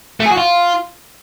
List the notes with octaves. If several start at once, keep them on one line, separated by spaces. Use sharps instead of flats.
A3
G#4
F#4
F4